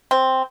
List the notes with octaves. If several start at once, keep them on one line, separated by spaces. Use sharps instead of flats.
C4